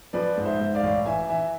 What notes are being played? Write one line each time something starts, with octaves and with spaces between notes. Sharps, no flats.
F3 B4 D5
G#2
C5 E5
G#2
D5 F5
A1
E3 E5 G#5
E3 E5 G#5